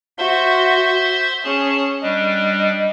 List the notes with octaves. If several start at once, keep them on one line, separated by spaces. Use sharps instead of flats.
F#4 C5 E5 C6
C#4 G#4 A5
G3 D4 D#5